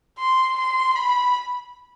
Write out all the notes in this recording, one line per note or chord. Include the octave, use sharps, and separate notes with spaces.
C6
C6
B5